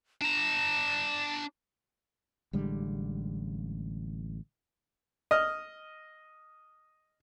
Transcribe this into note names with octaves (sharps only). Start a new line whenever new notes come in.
D4 A#5 E7
A1 D3 G3 G#3
D#5 F6